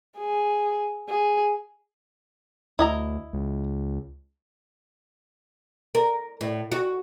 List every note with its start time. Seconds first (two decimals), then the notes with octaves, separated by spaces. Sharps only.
0.18 G#4
1.09 G#4
2.79 D2 E4 D#5 A#5
3.33 C#2
5.95 A#4
6.41 A2
6.72 F#4